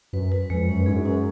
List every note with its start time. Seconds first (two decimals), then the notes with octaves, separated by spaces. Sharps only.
0.13 F#2 B4
0.32 B4
0.50 F2 G#3
0.68 F#2 C#4
0.86 G#2 G#4
0.96 F#2
1.05 C#4